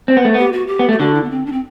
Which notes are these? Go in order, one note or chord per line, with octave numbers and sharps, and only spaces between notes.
C4
B3
A3
B3 G4
F#4
G4
B3
A3
G4
D3 F#4
E4
B3
C4
D4
C4